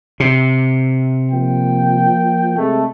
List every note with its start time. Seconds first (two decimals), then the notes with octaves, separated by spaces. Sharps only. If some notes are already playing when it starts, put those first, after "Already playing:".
0.20 C3
1.32 F3 A#3 G5
2.56 C3 G#3 A3